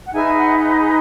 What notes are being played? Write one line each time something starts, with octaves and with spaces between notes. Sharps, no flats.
F#5
D#4 G#4 B4 E5 G#5
D#5 F#5
E5
D#5